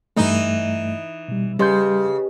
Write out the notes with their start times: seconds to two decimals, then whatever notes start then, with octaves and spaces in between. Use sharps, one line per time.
0.17 G2 E3 A3 D#4
1.28 B2 G3
1.59 C#3 G3 G4 B4 D#5 C6 G6